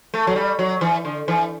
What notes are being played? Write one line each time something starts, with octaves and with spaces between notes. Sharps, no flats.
A3
F#3
G3
F#3
E3
D3
E3